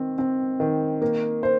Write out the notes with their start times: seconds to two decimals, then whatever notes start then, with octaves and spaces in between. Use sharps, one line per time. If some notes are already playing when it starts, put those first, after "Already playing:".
Already playing: D#3 C4
0.18 C4
0.60 D#3
1.02 A#3
1.43 C5